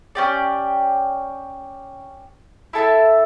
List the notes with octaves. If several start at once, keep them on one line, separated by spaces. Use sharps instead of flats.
C#4 G4 D5
E4 A4 E5 A5